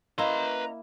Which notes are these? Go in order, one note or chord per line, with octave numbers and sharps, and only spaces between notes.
A#3 C#4 E4 B4 D#5 F5 A#5 C6